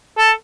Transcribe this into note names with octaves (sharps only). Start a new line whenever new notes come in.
A4